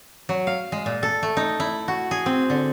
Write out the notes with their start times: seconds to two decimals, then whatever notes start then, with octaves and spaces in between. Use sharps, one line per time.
0.29 F#3
0.47 F5
0.72 G#3
0.86 A#2
1.03 A4
1.23 A3
1.37 D#4
1.60 E4
1.88 F#4
2.11 G#4
2.26 C4
2.50 D3